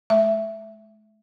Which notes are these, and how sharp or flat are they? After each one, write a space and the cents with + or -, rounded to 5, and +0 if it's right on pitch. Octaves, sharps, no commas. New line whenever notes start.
G#3 +45 E5 +5